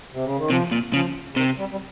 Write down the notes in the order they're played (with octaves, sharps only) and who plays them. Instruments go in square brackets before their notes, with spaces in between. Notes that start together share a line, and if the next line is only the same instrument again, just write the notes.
[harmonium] C3
C#3
D#3
[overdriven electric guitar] C3 [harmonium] F3
[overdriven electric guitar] A#2
[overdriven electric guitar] C#3 [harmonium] F3
[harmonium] C#3
[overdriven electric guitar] C3 [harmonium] D#3
[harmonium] G3
G3